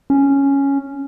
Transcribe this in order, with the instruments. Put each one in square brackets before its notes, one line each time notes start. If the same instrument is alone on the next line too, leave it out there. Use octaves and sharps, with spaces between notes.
[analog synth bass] C#4